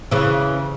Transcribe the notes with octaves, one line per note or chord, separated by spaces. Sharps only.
C#3 E3